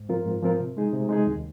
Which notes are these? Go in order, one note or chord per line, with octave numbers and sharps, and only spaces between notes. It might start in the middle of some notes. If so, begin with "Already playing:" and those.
Already playing: G#2
F3 C4 F4 A#4
G#2
F3 C4 F4 A#4
C3
G#3 D#4 G#4
C3
G#3 D#4 G#4
D#2